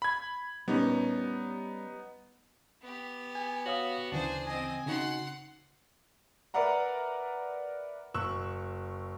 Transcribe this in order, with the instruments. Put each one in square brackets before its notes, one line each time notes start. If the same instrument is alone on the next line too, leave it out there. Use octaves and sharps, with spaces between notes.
[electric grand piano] B5 G#6
[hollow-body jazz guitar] G3 C#4 [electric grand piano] B3 D#4
[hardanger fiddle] B3 G4
[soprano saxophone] G#5
[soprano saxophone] F#4 [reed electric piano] C#5 F5 D#6
[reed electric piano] D2 C#3 E3 [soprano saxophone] D4 [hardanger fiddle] G#4 C5
[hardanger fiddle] C4 D#5 [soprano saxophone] G#5
[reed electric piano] C#3 D#4 F#4 [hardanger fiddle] F#5 C6
[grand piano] A#4 B4 D5 E5 F#5 A#5
F#1 C#6 E6 F#6 E7